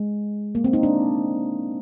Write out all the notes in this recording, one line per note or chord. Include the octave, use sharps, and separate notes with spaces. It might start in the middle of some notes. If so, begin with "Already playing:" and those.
Already playing: G#3
A#3
C4
D#4
D4